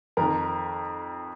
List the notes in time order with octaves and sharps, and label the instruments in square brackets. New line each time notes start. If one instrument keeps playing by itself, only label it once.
[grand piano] F2 D#3 A#4